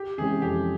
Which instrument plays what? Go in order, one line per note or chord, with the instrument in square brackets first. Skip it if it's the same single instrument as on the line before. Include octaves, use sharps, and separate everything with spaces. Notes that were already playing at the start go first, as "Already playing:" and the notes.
Already playing: [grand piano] G4
[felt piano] C3 E3 G#3 C#4 [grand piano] G#4
[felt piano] F2 [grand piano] G4